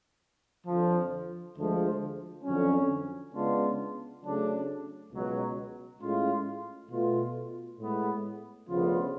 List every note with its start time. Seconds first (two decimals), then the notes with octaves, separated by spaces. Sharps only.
0.66 F2 D3 F3
1.56 D2 D3 F3 G#3
2.44 F2 D3 F#3 C#4
3.33 C#3 G#3 B3 D4 F4
4.22 C#3 F#3 A3 D4
5.12 C#2 B2 F#3
6.00 A2 G#3 C#4 F4
6.89 B2 A3 F4
7.78 A2 G#3 B3
8.68 D2 C#3 F3 B3 F4